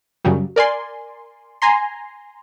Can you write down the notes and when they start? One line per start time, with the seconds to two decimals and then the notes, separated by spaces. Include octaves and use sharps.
0.25 F#2 C#3 F#3 G3
0.56 A#4 D5 G#5 C6
1.62 G#5 A#5 C6